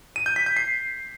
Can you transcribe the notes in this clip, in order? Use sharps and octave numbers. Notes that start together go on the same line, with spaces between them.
D#7
G6
B6
G6
C7